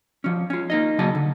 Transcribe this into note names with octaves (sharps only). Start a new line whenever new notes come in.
F3 C#4
C#4 F4
A#3 D#4 D#5
C#3 F#3 A#3 D#5 A5
D3